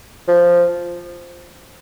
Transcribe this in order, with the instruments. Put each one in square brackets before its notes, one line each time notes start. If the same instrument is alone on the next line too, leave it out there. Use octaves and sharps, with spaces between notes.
[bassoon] F3